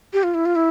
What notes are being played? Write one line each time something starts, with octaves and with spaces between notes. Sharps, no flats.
G4
F4
E4
F4
E4